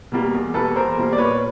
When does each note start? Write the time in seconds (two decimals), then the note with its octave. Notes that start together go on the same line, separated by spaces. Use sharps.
0.12 B2 G3 A#3
0.34 E2
0.54 B2 G3 A#3 A4 B4
0.76 E2 A#4 C5
0.98 B2 G3 A#3
1.13 D5
1.18 A#2 B4 C#5